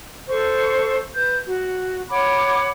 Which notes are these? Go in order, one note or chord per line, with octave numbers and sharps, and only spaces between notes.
A4 C5 C#6
B4 G6
F#4
C#5 F#5 B5 D6